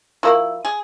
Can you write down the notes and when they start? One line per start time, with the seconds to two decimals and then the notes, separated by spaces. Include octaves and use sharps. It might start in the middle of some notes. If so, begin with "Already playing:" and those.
0.23 F3 A#3 E4 F#4
0.65 G#4